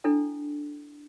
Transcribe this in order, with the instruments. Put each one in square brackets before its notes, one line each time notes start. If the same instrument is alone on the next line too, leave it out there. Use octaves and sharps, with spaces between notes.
[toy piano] D4 E4 A4 G5